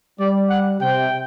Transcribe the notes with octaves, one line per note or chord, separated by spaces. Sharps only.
G3 D5
F#5
C3 G5